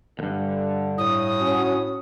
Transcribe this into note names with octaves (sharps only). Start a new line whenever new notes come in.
E2 G2 D3
A2 D#6
C#4 F#4